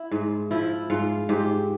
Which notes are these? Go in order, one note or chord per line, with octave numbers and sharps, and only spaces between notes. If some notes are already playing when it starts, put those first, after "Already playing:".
Already playing: E4
G#2
F3 E4
G#2 F4
G#2 G4